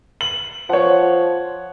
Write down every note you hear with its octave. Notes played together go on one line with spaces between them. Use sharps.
F#7
F3 C#5 F#5